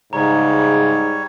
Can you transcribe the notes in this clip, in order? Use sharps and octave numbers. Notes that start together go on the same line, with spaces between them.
G#2 C#3 G3 C#5 A#5